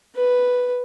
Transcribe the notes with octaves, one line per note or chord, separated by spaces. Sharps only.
B4